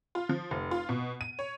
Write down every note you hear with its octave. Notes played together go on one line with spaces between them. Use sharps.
F4
F3
F1
F4
B2
D#7
C#5